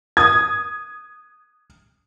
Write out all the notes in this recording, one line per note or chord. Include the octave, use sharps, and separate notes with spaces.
D#6 G#6